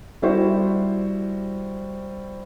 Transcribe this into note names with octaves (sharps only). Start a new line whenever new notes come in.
G3 E4 F#4 C5